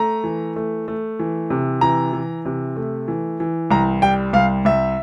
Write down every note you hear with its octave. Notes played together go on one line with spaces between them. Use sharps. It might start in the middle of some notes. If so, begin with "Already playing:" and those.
Already playing: A3 A#5
E3
A3
A3
E3
C3
E3 A#5
E3
C3
A3
E3
E3
C2 A#5
G3 G5
C2 F5
C2 E5